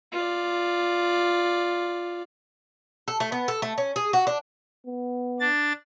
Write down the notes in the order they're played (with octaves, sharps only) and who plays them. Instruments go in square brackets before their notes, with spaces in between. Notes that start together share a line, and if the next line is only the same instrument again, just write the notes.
[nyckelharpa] F4 D5
[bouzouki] A4
A3
B3
A4
A3
C#4
G#4
F#4
D4
[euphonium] B3
[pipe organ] D4 A6